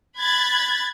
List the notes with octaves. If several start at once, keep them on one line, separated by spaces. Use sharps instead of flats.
B5 F#6 G#6 A6